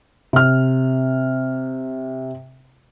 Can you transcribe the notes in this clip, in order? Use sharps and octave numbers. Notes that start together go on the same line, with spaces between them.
C3 F6